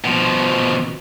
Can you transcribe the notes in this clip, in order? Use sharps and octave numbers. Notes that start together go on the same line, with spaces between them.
B2 F3